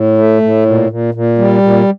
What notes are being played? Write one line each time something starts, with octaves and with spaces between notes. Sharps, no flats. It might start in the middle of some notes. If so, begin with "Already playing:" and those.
Already playing: A2
A3
A2
A#2
A#2
A#2
G3
A#2